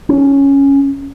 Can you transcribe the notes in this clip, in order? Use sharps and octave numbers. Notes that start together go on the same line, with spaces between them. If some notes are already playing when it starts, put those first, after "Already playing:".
C#4